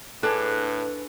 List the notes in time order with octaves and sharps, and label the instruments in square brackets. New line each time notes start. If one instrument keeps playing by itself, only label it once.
[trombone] A2 [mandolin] D4 G#4 [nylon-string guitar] A4 [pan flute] B4